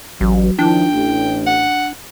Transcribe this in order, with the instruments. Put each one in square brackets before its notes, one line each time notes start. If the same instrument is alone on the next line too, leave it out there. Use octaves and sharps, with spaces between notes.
[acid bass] A1 [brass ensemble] F#3
[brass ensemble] D#3 F3 E4 [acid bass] D4 [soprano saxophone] G5
[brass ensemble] A1
[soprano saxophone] F#5